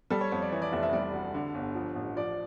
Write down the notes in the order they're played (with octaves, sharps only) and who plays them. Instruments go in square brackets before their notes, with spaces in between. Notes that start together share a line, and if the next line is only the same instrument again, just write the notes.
[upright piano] G3 A4
C#5
F2 C#5
D5
E3 C#5
D5
F1 E5
E5
G3 D5
D2
D3
G1
F3
A1
F3 D5